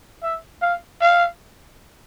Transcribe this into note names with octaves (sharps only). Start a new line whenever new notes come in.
E5
F5
F5